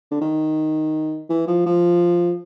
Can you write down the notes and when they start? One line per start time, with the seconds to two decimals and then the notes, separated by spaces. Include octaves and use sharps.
0.11 D3
0.21 D#3
1.30 E3
1.47 F3
1.66 F3